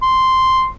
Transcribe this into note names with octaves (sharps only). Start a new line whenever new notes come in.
C6